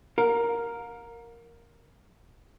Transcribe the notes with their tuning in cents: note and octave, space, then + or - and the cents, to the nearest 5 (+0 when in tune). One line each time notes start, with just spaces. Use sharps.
A#4 +0 F5 +40